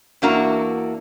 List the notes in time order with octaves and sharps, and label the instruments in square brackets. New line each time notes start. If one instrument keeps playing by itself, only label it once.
[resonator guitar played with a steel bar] E2 E3 A#3 D4 F#4 A#5